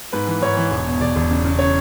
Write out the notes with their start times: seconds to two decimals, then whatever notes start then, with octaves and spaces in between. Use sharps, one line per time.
0.12 G#2 B4
0.27 E3
0.42 G#2 C#5
0.57 E3
0.71 E1
0.86 B2
1.01 E1 D5
1.16 E1
1.30 C#3
1.45 C#3
1.59 C#5